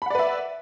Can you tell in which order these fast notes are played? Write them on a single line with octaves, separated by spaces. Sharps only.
B5 F#5 D5 B4 E5